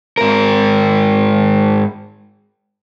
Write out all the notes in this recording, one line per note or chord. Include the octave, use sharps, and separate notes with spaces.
G#2 A#4